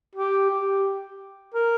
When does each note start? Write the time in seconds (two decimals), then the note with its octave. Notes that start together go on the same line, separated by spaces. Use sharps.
0.15 G4
0.49 G4
1.54 A#4